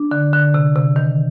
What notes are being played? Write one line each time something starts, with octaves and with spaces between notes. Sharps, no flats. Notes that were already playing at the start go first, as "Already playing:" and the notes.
Already playing: D4
D3
D3
C3
C3
D#3